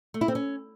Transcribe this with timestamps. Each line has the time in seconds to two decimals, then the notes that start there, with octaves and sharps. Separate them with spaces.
0.14 A3
0.21 E4
0.28 C4
0.35 C#4